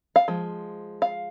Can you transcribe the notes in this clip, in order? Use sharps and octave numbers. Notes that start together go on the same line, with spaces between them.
F5
F3 G#3
F5